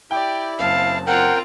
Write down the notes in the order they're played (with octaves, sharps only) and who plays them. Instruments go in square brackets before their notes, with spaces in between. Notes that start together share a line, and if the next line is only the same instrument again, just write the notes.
[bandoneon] E4 [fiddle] G4 D5 [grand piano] G5
[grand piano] F#1 [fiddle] C4 A5 [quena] F5
[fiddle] C4 F4 [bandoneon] A#4 G5 [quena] F#5